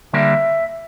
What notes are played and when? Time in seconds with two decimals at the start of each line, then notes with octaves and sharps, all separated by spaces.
0.13 D3 G3 A#3 D4 E5